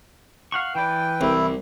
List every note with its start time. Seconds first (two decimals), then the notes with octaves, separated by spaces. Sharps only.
0.52 F5 F#5 C#6
0.75 E3 B4 D5 G5
1.21 C2 E4